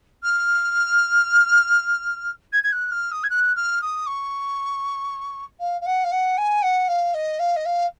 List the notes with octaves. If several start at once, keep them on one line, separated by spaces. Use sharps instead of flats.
F6
G#6
G#6
F#6
F6
D#6
G#6
F#6
F6
D#6
C#6
F5
F5
F#5
F5
F#5
G#5
F#5
F5
D#5
F5
D#5
F5